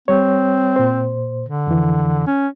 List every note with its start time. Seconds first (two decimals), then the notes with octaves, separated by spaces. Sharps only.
0.08 G3 C4 C#5
0.76 A#2 C5
1.46 D3
1.67 F2 E3
2.27 C#4